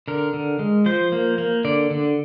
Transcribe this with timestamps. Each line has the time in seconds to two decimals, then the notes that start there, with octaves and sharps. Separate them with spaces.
0.08 D3 A#4
0.34 D3
0.59 G#3
0.86 F3 C5
1.12 A#3
1.38 A#3
1.65 D3 D5
1.91 D3